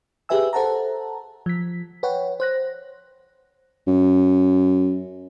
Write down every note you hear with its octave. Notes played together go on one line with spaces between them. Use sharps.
G4 G#4 B4 E5 G#5 E6
A4 C5 F#5 A5 A#5
F3 B6
B4 C#5 F#5 G5
C5 F#6 A#6
F#2